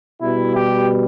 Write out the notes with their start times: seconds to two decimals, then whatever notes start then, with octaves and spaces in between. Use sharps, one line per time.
0.21 B2 G3 E4
0.54 G4